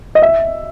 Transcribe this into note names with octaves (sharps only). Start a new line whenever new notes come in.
D#5
E5